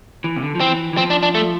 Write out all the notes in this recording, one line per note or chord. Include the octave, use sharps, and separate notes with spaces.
E3
C3
D3
F3
E3 C4
E3
F3 C4
D4
D4
A3